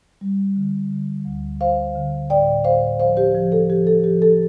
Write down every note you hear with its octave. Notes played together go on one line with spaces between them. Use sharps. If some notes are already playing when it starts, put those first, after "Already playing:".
G3
D3
D3
D2
D2 C5 F5
D3
A2 D5 G5
A2 C5 F5
F3 C5 F5
G4 C5
F3
A4
F3 G4
A4
F3 G4
A4